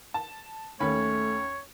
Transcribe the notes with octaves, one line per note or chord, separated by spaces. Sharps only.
A5
D#2 A3 C#4 C#5 B5